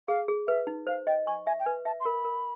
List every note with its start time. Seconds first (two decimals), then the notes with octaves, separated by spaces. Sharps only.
0.08 G#4 F5
0.28 G#4
0.47 B4 E5
0.67 D#4
0.87 C5 F5
1.07 D#5 G5
1.27 G#5 C#6
1.47 E5 G#5
1.60 G5
1.66 B4 G#5
1.85 E5 A5
2.00 C6
2.05 A#4 B5
2.25 A#4